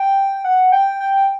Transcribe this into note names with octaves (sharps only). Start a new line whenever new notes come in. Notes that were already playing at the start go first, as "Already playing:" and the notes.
Already playing: G5
F#5
G5
G5